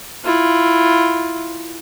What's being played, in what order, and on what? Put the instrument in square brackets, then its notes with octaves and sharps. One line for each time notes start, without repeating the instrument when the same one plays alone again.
[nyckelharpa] E4 F4